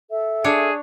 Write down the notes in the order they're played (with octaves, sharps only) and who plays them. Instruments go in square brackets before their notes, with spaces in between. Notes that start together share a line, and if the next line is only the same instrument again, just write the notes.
[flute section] A4 E5
[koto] D4 C#5 [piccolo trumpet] G#4